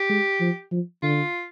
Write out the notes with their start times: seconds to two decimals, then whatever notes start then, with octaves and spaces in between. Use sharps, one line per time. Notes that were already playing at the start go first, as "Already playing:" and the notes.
Already playing: G4
0.09 G#3
0.40 F3
0.72 F3
1.02 D3 F4